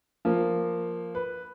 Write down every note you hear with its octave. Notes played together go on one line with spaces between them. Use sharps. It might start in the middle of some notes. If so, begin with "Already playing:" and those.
F3 A#3
B4